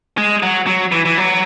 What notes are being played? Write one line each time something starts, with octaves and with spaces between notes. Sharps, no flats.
G#3
F#3
F#3
E3
E3
F#3